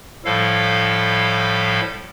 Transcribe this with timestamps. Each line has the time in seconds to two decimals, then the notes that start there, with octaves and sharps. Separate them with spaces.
0.25 A2 F3 G3 E4 A4 F5